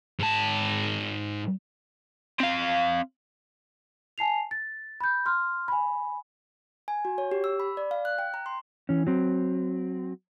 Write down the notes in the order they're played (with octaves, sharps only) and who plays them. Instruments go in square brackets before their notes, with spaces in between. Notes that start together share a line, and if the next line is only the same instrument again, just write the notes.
[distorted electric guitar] G#2 A5
[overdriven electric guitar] C4 F5
[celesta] G#5 A5 C7 F7
A6
B5 G6
C6 F6
G#5 B5
[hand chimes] G#5
F#4
C#5
G4
E6
B5
D5
F5
F#6
G5
A#5
C6
[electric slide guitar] E3 C#4
F#3 C4